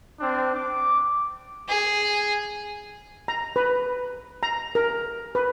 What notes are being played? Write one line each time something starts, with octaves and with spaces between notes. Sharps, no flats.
C4 D4
D6
G#4
A#5
B4
A#5
A#4
B4